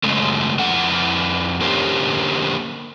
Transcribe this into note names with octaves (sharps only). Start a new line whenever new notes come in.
F#2 C#3 G#3 A3
F2 E4 F#5
D3 A#3 C#4 G4 A#4 C5